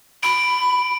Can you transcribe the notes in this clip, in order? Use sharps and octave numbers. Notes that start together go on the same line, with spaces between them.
B5 D7